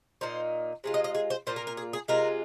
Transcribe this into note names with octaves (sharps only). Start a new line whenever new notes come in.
A#2 A#3 D#4 C5
C3 G#3 F4
D#5
D#5
G#4
C5
A#2 A#3 F4 C5
A#4
A#4
G#4
G#4
C3 G#3 F4 A#4